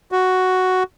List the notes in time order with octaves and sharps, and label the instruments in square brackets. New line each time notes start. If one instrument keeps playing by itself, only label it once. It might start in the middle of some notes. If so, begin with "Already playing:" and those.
[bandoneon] F#4